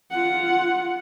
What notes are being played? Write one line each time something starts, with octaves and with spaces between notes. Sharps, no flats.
F4 F#5